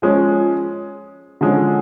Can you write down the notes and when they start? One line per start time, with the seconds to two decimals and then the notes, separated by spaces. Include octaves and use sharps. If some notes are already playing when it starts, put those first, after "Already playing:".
0.02 F3 G#3 C#4
1.41 D3 F3 G#3 C#4